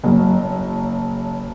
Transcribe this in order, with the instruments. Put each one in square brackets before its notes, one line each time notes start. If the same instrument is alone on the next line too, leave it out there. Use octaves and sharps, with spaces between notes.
[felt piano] F#1 F#3